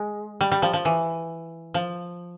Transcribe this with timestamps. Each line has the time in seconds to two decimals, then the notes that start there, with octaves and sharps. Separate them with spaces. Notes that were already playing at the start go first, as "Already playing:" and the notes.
Already playing: G#3
0.41 G3
0.52 G3
0.62 F3
0.73 F3
0.85 E3
1.74 F3